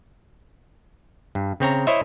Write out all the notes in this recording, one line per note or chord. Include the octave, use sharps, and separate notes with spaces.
G2
C#3 C4 C#5 A#5
E4 C5 C#5 D#5 E5